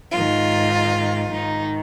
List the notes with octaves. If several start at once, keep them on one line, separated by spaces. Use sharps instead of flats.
G#2 D#3 F4
G#2 D#3 D#4